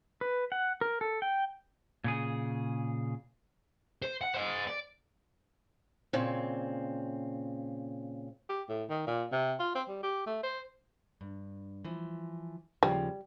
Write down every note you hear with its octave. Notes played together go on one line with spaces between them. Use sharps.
B4
F#5
A#4
A4
G5
A#2 C#3 G#4
C5
F#5
C5 D#5
D5
A#2 C#3 C4
G4
A2
D#3
A#2
C3
F4
C4
G3
G4
A3
C5
G2
E3 F3
D#2 C#3 F3 G3